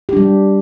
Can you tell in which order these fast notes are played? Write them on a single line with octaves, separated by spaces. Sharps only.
G4 D4 G3